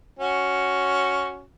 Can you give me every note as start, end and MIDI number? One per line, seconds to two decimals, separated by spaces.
0.19 1.43 61
0.19 1.43 66